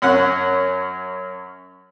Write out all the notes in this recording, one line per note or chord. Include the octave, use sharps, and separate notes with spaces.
F#2 C#4 F#5